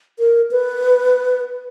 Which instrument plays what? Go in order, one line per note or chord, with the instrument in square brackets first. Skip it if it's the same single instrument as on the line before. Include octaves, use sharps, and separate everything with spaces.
[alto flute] A#4
B4